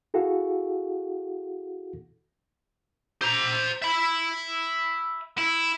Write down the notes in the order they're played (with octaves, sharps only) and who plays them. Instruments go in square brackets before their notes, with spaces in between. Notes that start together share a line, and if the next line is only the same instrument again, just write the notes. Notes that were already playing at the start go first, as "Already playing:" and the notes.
[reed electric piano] E4 F#4 G#4 A4 F5 F#5
[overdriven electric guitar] C5 A#5
E5 B5
E4